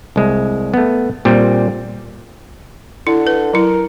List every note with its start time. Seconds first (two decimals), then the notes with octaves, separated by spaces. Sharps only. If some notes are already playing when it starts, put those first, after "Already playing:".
0.16 C2 G#3
0.74 A3 B3
1.25 A#2 G3 C4
3.07 D3 E4
3.27 B4
3.53 F#3 E4 A#4